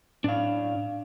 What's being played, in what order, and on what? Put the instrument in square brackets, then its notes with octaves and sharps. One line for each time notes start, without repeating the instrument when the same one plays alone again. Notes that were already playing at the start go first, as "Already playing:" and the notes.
[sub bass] A2 [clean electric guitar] D4 F5